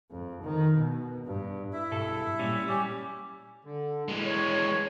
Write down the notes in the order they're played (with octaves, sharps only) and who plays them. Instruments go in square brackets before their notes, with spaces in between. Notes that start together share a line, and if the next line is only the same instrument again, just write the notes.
[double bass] F2
D#3
B2
G2
[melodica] E4 E5
[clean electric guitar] B1 G2 A4
A#2 G3 C#4
[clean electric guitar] G3 [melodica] C#4 G4
[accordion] D3
[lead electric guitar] E3 G#3
[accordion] C#5